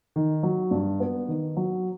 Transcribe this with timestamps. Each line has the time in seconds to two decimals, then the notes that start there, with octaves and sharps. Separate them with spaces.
0.16 D#3
0.43 F#3
0.71 G2
1.00 B3
1.28 D#3
1.57 F#3